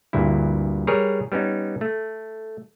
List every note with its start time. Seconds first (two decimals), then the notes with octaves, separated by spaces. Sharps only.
0.13 D2 G2 A#2 E4
0.87 G3 G#4 A#4 B4 C#5
1.32 G3 B3 C#4 D#4
1.81 A3